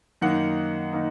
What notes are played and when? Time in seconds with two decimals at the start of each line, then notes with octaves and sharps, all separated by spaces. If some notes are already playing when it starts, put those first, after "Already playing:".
0.21 F#2 D#3 A#3 D#4 F#5
0.93 D#3 A#3 D#4